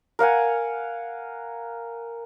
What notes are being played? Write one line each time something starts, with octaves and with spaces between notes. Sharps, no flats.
A#4 F5 F#5 G#5